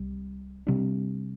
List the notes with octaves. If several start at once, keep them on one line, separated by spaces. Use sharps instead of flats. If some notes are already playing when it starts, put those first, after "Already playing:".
Already playing: C2 G3
C3 G3 D4